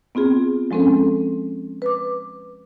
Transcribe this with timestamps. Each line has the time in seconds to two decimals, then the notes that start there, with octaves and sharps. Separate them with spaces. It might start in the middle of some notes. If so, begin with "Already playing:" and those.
0.15 B3 C4 F4 G#4
0.71 F3 G#3 C4 C#4 A4
1.82 B4 D6